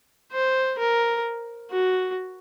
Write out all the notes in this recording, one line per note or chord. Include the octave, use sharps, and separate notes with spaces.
C5
A#4
F#4